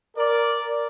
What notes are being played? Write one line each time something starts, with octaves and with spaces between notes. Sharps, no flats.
A#4 D5